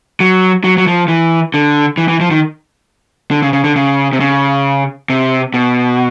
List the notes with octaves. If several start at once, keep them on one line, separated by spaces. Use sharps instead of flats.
F#3
F#3
F#3
F3
E3
D3
E3
E3
F3
D#3
D3
C#3
C#3
D3
C#3
C3
C#3
C3
B2